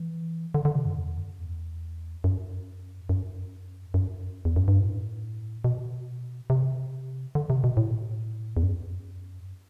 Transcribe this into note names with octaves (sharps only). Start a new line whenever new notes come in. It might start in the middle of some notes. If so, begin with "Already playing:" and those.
Already playing: E3
D3
D3
C3
F#2
E2
F#2
E2
F#2
F#2
F#2
E2
F#2
G2
A2
B2
C3
D3
C3
B2
A2
E2
F#2